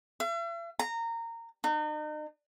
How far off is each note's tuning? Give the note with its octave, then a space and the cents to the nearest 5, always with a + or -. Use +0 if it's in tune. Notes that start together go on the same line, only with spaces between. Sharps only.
E5 +45
A#5 -20
D#4 -40